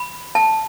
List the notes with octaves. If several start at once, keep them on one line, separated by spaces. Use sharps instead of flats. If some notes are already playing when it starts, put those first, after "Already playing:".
Already playing: B5
A5